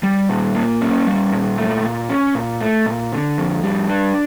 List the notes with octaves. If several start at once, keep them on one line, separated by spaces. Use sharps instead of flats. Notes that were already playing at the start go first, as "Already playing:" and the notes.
G3
A#2
A#3
C#4
G3
A#2
A3
A#2
C#4
A#2
A3
A#2
D3
F2
G3
D4